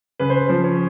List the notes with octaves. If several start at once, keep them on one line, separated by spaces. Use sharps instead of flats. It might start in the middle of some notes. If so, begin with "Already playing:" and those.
C#3 B4
C5
B4
F3 C5
C#5